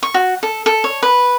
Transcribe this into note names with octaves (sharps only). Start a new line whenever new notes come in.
C#6
F#4
A4
A4
C#5
B4